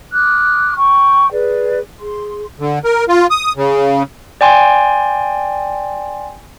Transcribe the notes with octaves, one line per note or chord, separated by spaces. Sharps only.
D6 D#6 F6 F#6
G5 C#6
G#4 B4 D5
G#4 C6
D3
A#4
F4
D#6
C#3
D5 G5 G#5 C6